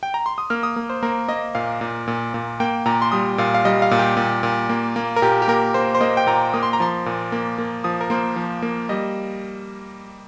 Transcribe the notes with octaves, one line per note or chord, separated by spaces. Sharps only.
G5
A#5
C6
D#6
A#3 F6
D#6
A#3
C5
A#3 A#4
A#3 D#5
A#2 F5
A#2
A#2
A#2
A#3 G5
A#2 A#5
C6
G3 D#6
A#2 F5
F5
G3 D#5
F5
A#2
G4
A#2
A#2
A#3
A#3
A#4
A#2 G4
G4
A#3 A#4
A#3 C5
C5
A#3 D#5
G5
A#2 A#5
A#3 D#6
C6
A#5
F3 C6
A#2
A#3
A#3
F3 D#6
A#4
A#3 C5
F3
A#3
G3 D#5